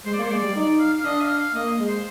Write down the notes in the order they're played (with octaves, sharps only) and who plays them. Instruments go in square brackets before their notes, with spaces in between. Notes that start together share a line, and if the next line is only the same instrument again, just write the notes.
[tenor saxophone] G#3 [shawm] C5
[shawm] D5
[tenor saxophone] A#3 [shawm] C5
[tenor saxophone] G#3 [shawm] D5
[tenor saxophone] G3
[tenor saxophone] D#4 [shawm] D5
[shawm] F5
F5
[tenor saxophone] D4 [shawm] D#5
[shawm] F5
F5
[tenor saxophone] A#3 [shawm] D#5
[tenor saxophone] G#3
[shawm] C5